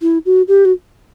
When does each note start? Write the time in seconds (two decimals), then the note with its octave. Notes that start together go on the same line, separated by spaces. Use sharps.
0.02 E4
0.26 F#4
0.48 G4
0.65 F#4